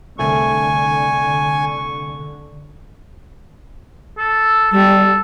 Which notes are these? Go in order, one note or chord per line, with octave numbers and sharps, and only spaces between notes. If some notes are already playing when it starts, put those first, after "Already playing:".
C2 D3 A3 G#5 C#6
A4
G3 A4